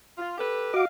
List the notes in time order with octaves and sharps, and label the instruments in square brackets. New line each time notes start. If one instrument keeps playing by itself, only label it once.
[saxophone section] F4
G4 A4 B4
[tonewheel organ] F#4 D6 [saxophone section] D#5 F5